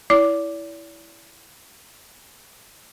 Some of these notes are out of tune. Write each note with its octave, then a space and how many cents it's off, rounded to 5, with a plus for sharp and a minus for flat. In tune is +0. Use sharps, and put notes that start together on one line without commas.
E4 +0 D5 -45 D6 +0